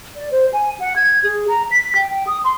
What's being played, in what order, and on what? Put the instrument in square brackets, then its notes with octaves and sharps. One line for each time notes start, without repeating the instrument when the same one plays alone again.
[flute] D5
C5
G#5
F#5
G#6
G#4
A#5
B6
G5
G5
D#6
C6